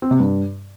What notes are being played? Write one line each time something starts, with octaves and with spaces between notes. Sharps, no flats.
C4
C3
G2